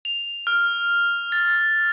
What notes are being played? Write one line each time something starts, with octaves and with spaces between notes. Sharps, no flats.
F7
F6
A6